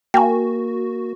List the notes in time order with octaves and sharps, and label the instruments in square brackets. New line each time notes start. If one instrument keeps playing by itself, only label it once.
[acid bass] A#3 [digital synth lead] F#4 [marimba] G5 G#5